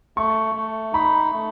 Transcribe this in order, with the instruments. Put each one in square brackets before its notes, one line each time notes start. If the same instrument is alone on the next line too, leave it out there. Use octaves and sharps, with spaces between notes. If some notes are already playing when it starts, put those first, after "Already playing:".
[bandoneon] A3 [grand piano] C#6
[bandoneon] A3
[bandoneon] D#4 [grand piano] B5
[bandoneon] A3